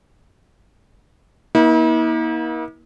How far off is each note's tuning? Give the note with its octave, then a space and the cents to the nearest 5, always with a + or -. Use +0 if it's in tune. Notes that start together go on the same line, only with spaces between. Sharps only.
A#3 +35 E4 -45